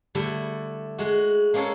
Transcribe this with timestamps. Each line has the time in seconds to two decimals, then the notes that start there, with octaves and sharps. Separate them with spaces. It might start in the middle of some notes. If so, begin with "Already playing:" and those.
0.15 D3 G3 A3 E4
0.98 G#3 F#4
1.54 G#3 A#3 C#4 G#4 A4 C#5